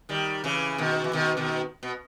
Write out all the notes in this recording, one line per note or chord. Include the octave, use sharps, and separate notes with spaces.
D#3 G3
C#3 E3
B2 D#3
E3
B2 D#3
B2 D#3
B2